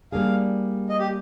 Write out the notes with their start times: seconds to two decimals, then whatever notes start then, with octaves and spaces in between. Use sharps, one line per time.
0.12 G3 A#3 D4 G#4 F5
0.89 D#5
0.99 G4